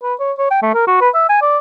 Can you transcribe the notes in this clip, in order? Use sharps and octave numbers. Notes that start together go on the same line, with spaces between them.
B4
C#5
C#5
G5
A3
A#4
F#4
B4
E5
G#5
D5